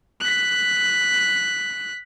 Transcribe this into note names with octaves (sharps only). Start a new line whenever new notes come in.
F#6 B6